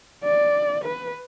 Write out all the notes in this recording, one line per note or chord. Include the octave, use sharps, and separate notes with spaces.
D5
B4